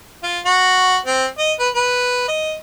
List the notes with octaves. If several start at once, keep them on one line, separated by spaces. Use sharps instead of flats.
F4
F#4
C4
D#5
B4
B4
D#5